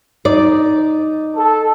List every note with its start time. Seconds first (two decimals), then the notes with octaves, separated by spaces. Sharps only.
0.25 D#4 D5
1.36 A4